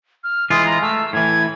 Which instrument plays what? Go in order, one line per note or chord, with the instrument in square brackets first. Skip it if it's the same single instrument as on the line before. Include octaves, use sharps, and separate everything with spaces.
[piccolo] F6
[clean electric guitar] E3 G#3 F4 [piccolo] D#6
[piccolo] A#5
[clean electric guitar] A3 [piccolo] E6
[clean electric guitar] A2 E3 [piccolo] G#6